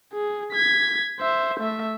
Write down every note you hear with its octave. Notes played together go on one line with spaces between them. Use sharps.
G#4
G#6 B6
C5 E5
A3 E5